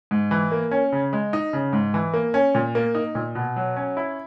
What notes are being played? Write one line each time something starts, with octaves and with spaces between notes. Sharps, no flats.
G#2
E3
A#3
C#4
C#3
G#3
D#4
C#3
G#2
E3
A#3
C#4
A#2
A#3
D#4
A#2
B2
F#3
C#4
E4